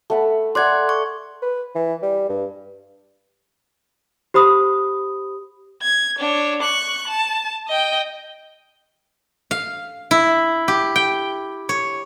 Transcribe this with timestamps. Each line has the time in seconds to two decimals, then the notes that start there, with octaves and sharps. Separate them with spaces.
0.10 A3 F#5 B5
0.55 D5 F#5 C6 F#6 G#6
0.89 C#6
1.42 B4
1.75 E3
2.03 G3
2.29 G2
4.34 G4 C5 B5 D#6
5.82 G#6
6.19 D4 C#5
6.61 C#6 F#6
7.08 A5
7.68 D#5 G5
9.51 F5
10.11 E4
10.68 G4
10.96 G5
11.69 C#5